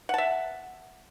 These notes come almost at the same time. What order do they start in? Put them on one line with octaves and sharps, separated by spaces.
F#5 A5 E5